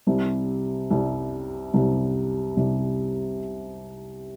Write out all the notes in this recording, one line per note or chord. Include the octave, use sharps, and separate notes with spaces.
C2 C3 G3
C2 C3 G3
C2 C3 G3
C2 C3 G3